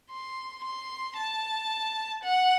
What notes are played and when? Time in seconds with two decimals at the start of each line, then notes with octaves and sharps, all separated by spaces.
0.10 C6
0.64 C6
1.16 A5
2.24 F#5